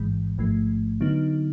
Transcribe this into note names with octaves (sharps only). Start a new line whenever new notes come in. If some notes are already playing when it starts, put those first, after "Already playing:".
Already playing: A1 G#2 E3 G#3
A1 G#2 F3 A3
D3 F#3 B3 D#4